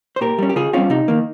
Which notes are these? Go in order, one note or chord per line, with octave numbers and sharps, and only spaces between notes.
C5
A#2 G4 A#4
G3 C#4
G4
C#3 F4 G#4
G3 C4 C#4 F4
C3 D#4
D#3 A#3